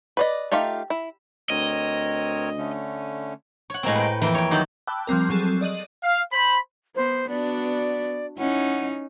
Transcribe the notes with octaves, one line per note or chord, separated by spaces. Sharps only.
B4 D5 D#5
A3 D#4 F4 G4 F5
E4
D2 C4 A#4 C#5 D#5
D3 A3 C#4
C#5 F#5
A2 G#3 A#3 C4
B4 G5
F2 E3 A#3 B4 G5 C6
C#5 G5
D#3 F#3 G4 C6
G5 A5 B5 D6 E6 F#6
F3 G3 C4 A#4
F#3 C4 G#4 A4
D5 D#5 D#7 F#7
F5
C5 B5
B3 C5
B3 D4 F#4 D5
C#4 D#4 E4 F#5